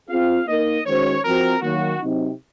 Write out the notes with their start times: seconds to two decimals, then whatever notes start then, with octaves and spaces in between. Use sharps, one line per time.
0.09 C4 F4 G#4 F5
0.47 A#3 D#4 A#4 D#5
0.85 D#3 G#3 C#4 F#4 C5 C#5
1.23 F3 C4 F#4 A#4
1.61 D#3 F#3 A#3 F#4
2.00 C3 F#3 C4 D#4